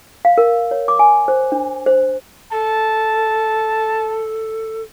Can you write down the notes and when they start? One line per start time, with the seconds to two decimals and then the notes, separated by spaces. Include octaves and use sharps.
0.25 F5
0.38 A#4
0.71 C#5
0.88 D6
0.99 G#5
1.28 C5
1.52 D4
1.86 C5
2.52 A4 A5